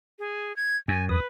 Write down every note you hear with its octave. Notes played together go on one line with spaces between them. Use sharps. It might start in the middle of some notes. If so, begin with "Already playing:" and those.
G#4
G#6
F#2 G#5
E2 B4 D#6